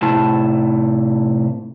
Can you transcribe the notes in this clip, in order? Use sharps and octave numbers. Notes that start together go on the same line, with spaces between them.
A2 C3 E4 A5